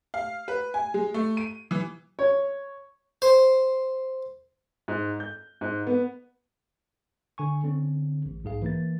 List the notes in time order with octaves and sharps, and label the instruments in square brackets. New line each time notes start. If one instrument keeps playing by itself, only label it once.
[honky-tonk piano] F5
B4
G#5
G#3
A3
D#7
E3
[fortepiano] C#5
[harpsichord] C5
[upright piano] G#2
G6
G#2
B3
[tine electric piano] D3 G#5 C#6
D3 C4 C#4
A1
B1 G#2 G#4 F5
E3 A#3 A6